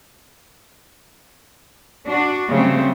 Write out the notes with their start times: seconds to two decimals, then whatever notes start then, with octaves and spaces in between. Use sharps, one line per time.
2.06 D4 F#4
2.49 C#3 F#3 G3 A3 C4